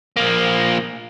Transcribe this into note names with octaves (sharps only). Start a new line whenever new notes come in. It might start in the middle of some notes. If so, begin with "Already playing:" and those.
F3 A#3